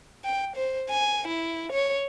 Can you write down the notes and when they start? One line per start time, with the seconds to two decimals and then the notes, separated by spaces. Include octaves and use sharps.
0.25 G5
0.56 C5
0.90 G#5
1.27 E4
1.72 C#5